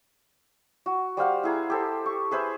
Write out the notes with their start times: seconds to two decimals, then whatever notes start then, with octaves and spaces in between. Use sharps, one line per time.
0.86 F#4
1.17 G3 C5 F5 F#5
1.43 E4 G#4 A#5
1.70 G4 A4 C5
2.06 C#6
2.31 G#4 B4 C5 E5